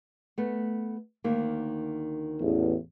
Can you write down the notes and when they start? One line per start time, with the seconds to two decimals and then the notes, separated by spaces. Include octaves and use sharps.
0.38 A3 B3
1.24 D2 D#3 A#3
2.41 A1 E2